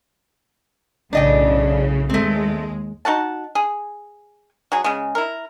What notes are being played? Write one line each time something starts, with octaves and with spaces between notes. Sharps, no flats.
B1 A2 C#3 D4 D#5 G5
D#2 G#3 A3 C4
D#4 F#4 F#5 A5
G#4
F#3 G#4
C#3 G#3
E4 A#4